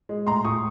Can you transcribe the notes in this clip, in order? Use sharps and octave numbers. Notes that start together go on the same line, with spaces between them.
G#3
A2 A#5 C6
A2 C#6 D#6